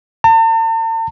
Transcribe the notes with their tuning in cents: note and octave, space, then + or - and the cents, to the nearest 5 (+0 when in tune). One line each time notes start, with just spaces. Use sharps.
A5 +45